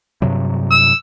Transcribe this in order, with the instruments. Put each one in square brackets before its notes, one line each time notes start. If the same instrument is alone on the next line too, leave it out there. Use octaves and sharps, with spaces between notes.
[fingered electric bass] G2 C3 F#3
[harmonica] E6